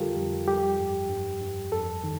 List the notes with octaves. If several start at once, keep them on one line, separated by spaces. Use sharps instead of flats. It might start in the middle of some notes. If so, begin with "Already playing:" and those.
Already playing: F2 D3 G3 F4 G4 A4 A#4
F2
G3 G4
G2
G2
G2
F2 A4
D#3